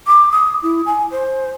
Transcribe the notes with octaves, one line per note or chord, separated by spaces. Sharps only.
D6
D#6
E4
G#5
C5